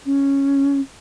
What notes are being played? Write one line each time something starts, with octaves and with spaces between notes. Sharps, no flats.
C#4